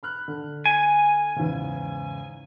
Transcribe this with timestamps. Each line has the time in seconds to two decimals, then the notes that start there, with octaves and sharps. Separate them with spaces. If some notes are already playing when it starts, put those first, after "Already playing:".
0.03 B5 F6 F#6
0.28 D3
0.66 G#5
1.36 E2 G#2 C#3